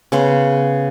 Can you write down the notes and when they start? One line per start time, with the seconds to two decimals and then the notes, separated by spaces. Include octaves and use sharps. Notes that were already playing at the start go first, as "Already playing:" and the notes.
0.12 C#3 B3 C6